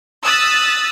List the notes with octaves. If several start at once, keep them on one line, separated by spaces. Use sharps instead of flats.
D#6 E6 F#6 A6 B6